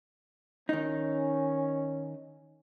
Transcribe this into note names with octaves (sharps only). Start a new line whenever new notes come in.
D#3 C#4 D#4